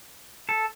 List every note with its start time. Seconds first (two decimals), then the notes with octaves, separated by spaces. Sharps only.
0.49 A4